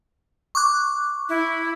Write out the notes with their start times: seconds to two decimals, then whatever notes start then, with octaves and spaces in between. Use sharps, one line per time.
0.55 C#6 D6 F#6
1.29 E4